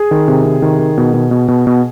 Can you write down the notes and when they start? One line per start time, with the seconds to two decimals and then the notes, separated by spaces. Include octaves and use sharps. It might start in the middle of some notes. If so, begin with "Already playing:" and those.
Already playing: G#4
0.11 D#3
0.28 C3
0.45 C3
0.62 D#3
0.79 D#3
0.97 B2
1.14 B2
1.31 B2
1.48 B2
1.67 B2